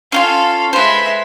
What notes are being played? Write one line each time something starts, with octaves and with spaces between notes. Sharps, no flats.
C#4 D#4 F4 A4 F5
G#3 B4 C5 E5